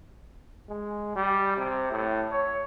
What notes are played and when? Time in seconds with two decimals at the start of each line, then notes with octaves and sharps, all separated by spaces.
0.69 G#3
1.15 G3
1.58 C3
1.91 A2
2.32 C#5